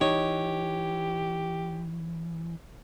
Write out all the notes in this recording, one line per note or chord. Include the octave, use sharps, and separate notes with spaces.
E3 D#4 G4 C#5